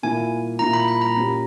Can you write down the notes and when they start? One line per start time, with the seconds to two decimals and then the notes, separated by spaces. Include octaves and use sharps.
0.03 A#2 A#3 E4 G#5
0.59 A#2 A#3 E4 A#5
0.73 B5
0.88 B5
1.01 A#5
1.15 A#2 A#3 C#4 G4